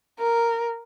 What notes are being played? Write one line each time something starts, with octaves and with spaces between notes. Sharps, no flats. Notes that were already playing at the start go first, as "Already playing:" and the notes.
A#4